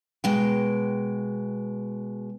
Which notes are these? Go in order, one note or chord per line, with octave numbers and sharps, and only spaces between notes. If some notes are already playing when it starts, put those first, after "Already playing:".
B2 G#3 G5